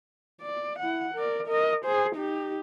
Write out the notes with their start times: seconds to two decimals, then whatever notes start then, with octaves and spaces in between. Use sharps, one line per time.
0.42 D5
0.79 E4 F#5
1.15 A#4 D5
1.47 A#4 D#5
1.85 G#4 C5
2.15 D#4 G4